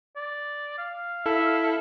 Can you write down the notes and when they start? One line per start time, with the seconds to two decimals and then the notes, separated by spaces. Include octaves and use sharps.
0.16 D5
0.78 F5
1.26 E4 A4 E5